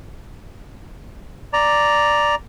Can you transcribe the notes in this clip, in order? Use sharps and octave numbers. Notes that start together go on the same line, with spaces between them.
D5 A#5